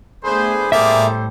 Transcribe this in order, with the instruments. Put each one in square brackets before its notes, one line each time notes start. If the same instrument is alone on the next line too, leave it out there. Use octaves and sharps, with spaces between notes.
[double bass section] A3 B3 [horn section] D4 G#4 C5 [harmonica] B4
[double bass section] A2 [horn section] G3 A4 C5 [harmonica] A#3 G#4 D5 [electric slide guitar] E5